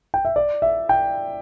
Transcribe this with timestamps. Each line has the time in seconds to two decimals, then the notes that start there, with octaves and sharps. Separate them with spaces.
0.14 G5
0.25 E5
0.36 D5
0.62 E5
0.89 G5